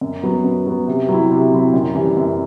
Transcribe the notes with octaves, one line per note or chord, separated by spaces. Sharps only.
F#2
F#3 B3
F#2
F#3 B3
C3
F#3 C4 E4
C3
F#3 C4 E4
F#2
E3 G3
F#2